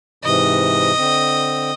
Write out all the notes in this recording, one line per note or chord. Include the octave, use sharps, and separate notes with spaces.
G#2 C3 E3 D#5
D3 C4